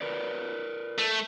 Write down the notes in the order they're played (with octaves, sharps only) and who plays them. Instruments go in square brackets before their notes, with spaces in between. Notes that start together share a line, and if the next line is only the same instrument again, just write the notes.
[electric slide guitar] A#4 B4 D5
[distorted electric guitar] A3